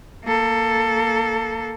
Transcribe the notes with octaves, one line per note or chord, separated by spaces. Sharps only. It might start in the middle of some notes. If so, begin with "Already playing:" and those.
A#3 A4